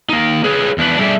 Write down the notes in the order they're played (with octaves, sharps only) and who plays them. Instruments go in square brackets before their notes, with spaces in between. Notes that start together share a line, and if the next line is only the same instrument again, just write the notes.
[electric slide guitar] A#3 D#4
G#4 B4 C#5
E2 D4 B4
G3 A3 D4 G#4 D5 E5